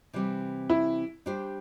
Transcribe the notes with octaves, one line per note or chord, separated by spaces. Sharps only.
C3 E3 G3 C4
E4
G3 D4 G4 C5